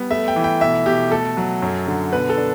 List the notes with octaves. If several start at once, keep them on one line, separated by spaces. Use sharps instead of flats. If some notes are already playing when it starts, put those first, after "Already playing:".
Already playing: G3 B3
A3 E5
G5
E3
G5
B2 E5
B2 G4
A3 A4
F#3
F#2
D3
B2 B4
A4
D4